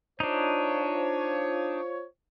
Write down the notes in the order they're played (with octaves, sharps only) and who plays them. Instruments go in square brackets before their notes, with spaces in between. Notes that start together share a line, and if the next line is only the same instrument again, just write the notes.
[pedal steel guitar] D4 D#4 [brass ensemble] F4 C5 C#5